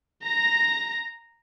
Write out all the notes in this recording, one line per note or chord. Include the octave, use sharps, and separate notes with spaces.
A#5 A#6